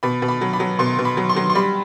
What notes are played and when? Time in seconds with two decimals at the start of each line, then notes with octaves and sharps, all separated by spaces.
0.03 B2 B5
0.22 B2
0.28 B5
0.41 F#3
0.53 B5
0.60 F#3
0.79 B2 C6
0.98 B2
1.05 B5
1.17 F#3
1.29 C6
1.36 F#3
1.50 C6
1.55 G3 B5